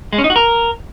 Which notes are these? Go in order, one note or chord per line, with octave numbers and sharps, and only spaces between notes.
G#3
C#4
D#4
F#4
A#4